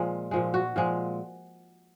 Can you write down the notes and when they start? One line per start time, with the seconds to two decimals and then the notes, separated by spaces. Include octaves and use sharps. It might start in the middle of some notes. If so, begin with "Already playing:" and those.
Already playing: A#2 F3 G#3
0.31 A#2 F3 G#3
0.54 F#4
0.76 A#2 F3 G#3